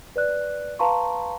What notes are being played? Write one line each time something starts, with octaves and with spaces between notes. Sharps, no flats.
B4 D5 F#6
B4 F5 A5 A#5 C6 C#6